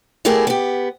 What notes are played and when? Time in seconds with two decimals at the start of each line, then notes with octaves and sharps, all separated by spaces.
0.25 A3 B3 E4 G4 G#4 A#4
0.47 B3 G4